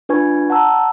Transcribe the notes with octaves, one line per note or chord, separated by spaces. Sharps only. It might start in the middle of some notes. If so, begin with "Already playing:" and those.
D4 F4 B4 G#5 C#6 G#6
F#5 A5 A#5 E6